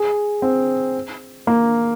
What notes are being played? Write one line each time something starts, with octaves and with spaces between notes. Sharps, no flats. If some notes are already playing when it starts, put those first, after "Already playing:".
Already playing: G#4
C4
A#3